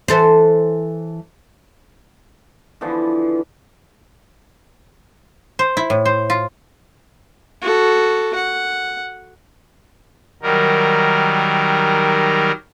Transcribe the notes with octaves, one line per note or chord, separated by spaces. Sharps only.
E3 A4 C5
D3 E3 F3 B3
C5
E4
A2
C5
F4
F#4 A4
F#5
D#3 F#3 G3 A#4